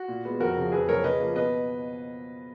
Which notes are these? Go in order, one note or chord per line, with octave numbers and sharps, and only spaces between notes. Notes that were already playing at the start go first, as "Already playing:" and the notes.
Already playing: F#4
A#2
G#3 B3
F2 F#4 A#4
C#3 F3
F2 G#4 B4
C#3 F#3 A#3 A#4 C#5
C#3 B4 D#5
F3 A#3
B2 B4 D#5